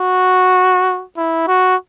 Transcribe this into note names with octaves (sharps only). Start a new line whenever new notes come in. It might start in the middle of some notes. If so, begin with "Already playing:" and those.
Already playing: F#4
E4
F#4